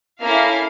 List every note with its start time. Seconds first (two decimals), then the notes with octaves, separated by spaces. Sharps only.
0.22 A#3 C#4 E4 A4 F5